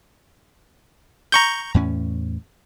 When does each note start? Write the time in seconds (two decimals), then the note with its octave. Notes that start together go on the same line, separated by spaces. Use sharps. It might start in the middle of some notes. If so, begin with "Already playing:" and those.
1.32 A#5 C#6 G6
1.74 E2 A2 C#4